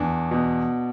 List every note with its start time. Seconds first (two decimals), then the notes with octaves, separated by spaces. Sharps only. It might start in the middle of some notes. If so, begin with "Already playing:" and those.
Already playing: E2 D4
0.31 B2